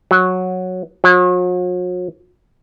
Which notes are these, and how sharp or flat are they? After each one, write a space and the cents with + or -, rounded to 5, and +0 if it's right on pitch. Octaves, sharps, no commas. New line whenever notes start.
F#3 -10
F#3 -45